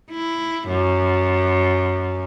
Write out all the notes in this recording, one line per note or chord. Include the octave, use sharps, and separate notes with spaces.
E4
F#2